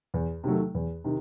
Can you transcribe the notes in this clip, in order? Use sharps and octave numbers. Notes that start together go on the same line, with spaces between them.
E2
C3 D#3 F#3 A3
E2
C3 D#3